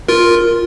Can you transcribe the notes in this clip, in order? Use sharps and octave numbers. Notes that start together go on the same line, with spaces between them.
F4 A#4